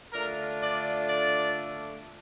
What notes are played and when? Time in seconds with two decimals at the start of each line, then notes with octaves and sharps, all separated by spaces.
0.12 D3 A3 D4 F4 A#4
0.60 D5
1.07 D5